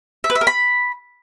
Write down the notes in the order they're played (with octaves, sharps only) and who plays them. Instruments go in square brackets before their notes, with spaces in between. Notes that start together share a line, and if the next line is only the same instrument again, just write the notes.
[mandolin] E5
B4
E5
A#4
B5